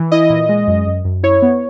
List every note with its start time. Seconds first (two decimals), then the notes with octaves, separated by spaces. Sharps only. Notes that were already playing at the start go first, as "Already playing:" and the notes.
Already playing: E3
0.12 E4 D#5
0.30 A#2
0.49 G#3
0.67 F#2
0.86 F#2
1.05 F#2
1.23 E4 C#5
1.42 B3